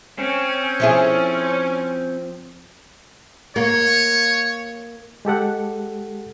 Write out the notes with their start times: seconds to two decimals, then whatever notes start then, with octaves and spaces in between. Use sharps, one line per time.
0.19 C4 C#4
0.80 F3 E4 G#4
3.56 A#3 C#5
5.25 G#3 G4 A4 F#5